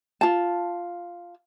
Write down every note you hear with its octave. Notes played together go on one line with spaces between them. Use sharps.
F4 A5